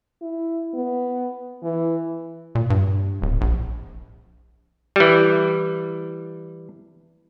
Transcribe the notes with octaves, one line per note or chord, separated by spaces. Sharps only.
E4
B3
E3
A#2
G2
D1
A#1
E3 G3